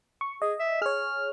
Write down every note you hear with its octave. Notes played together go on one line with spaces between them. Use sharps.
C#6
G#4 D#5
E5
G#4 C#5 F6